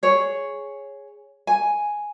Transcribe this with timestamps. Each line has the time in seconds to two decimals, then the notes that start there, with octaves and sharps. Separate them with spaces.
0.03 G#4 C#5
1.47 G#5